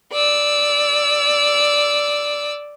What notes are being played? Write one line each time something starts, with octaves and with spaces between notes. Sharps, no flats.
D5 E6